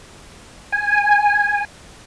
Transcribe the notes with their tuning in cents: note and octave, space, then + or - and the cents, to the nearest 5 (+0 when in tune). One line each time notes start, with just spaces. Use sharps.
G#5 -10